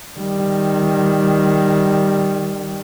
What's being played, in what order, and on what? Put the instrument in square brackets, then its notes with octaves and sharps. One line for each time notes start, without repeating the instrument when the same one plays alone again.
[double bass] D#3 G3